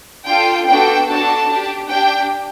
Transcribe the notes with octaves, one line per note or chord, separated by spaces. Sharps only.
D4 F4 A4 G5
B3 D4 F#4 A4 G5
D4 F#4 A4 A5
D4 G4
D4 G4 G5